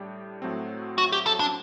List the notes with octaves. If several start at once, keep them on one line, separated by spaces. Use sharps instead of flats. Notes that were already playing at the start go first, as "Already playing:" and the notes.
Already playing: A2 G3 D4 G4
A2 F#3 A3 C4
F#4
G4
A4
D4